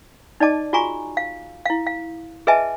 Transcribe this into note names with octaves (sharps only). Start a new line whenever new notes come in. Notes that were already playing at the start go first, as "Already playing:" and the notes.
D#4 D5 D#5 A5 D6
F4 F#4 G#4 G#5 A#5 C#6
F5
E4 F5
F5
G#4 B4 D#5 E5 G#5 A5